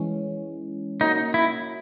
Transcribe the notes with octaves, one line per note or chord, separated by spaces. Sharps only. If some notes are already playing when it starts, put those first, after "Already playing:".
Already playing: E3 G#3 C#4
A#3 C#4 D#4 F#4
E4